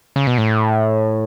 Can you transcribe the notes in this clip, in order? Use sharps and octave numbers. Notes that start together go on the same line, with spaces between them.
C#3
B2
A2